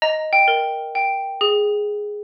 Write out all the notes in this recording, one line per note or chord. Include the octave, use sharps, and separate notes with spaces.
D#5 A#5
G5
A#4
G5
G#4